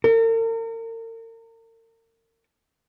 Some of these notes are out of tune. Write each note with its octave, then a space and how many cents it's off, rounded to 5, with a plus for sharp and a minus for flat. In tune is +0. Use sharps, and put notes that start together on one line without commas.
A#4 -40